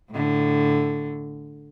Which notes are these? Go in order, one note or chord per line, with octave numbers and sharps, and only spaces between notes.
A2 D3